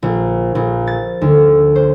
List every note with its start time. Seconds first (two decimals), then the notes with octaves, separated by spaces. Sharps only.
0.03 A#1
0.55 A#1
0.88 A6
1.21 D2
1.76 C5